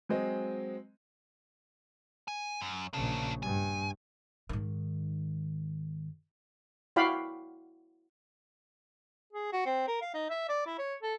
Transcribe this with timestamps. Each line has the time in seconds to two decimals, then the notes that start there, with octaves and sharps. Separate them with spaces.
0.09 F#3 G#3 C4 D#5
2.28 G#5
2.61 F#2
2.93 A#1 C#3 A#3 D4
3.43 G2 G#5
4.49 G#2 D#3
6.96 E4 F#4 D5 F5 G5 B5
9.33 G#4
9.53 F#4
9.66 C4
9.88 A#4
10.02 F5
10.14 D#4
10.30 E5
10.49 D5
10.67 E4
10.78 C#5
11.03 A4